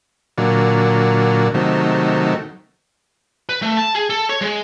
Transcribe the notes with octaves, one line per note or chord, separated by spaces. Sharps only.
A#2 D3 F#3
C3 D#3 F#3 A3
B4
A3
A5
G#4
A4
C#5
G#3